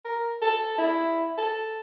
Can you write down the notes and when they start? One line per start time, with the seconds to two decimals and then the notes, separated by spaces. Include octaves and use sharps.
0.05 A#4
0.42 A4
0.78 E4
1.38 A4